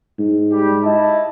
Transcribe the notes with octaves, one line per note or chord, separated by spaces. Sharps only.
G#2
G3 G4
E4 D#5 A5